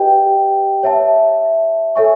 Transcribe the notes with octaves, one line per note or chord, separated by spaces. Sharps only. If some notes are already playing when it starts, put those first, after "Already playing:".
Already playing: G4 B4 D#5 G5
C#5 E5 A5
A4 C#5 E5 G#5 C#6